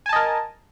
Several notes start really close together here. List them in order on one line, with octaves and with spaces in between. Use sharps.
G#5 A5 D#5 A#4